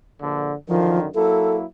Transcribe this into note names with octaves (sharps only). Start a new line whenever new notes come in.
A#1 D3
F#2 D3 D#3 F3
F#3 A#3 E4 A4